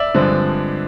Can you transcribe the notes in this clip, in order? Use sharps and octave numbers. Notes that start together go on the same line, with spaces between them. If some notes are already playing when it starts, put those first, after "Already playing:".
Already playing: D5 E5
G2 D3 F3 G#3 C4